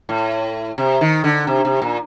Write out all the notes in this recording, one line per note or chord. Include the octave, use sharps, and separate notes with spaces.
A2
C3
D#3
D3
C3
C3
A#2